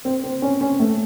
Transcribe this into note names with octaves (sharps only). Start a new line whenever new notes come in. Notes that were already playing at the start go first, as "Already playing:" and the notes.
C4
C4
C#4
C#4
A3